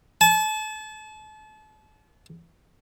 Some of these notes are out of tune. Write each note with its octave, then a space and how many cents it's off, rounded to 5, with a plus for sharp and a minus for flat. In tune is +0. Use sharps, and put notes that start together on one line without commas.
A5 -35